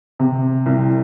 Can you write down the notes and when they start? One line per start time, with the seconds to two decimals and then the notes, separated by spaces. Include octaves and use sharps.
0.19 C3
0.66 C2